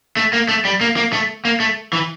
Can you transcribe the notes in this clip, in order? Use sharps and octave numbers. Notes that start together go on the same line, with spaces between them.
A3
A#3
A3
G3
A#3
A#3
A3
A#3
A3
E3